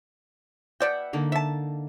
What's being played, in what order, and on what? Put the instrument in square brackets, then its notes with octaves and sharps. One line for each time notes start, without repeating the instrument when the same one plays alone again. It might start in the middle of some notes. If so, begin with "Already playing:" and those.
[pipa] B2 D5 G5 [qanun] E5 F#5 B5
[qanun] D3 A#3 D#4
[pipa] E5 A5